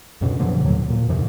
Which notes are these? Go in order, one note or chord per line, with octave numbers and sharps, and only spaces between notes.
C#2 F#2 B2 D3
B2 D3 F3 F#3
D#2 A2 F#3
A#2
F2 G#2 C3 D#3